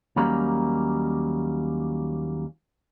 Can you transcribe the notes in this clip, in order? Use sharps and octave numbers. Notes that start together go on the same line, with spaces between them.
D#2 F#3 G3 A#3 C#4 D#4